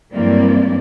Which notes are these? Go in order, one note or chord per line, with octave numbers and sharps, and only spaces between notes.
G2 E3 F#3 A#3 C4 D5